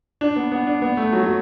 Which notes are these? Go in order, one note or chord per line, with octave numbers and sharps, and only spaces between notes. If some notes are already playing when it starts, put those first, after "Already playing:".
D4
B3
B3
D4
B3
A3
F#3
F#3